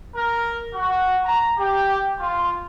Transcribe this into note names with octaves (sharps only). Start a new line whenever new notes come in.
A#4
F#4
A#5
G4
F4